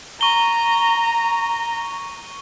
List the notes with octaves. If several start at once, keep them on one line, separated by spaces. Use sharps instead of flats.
A#5 C#6 G7